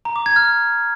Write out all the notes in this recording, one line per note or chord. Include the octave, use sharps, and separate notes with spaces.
A#5
D6
G#6
F6